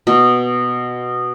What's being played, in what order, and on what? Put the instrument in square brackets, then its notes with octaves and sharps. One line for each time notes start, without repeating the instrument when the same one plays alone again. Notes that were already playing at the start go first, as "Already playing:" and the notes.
[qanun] B2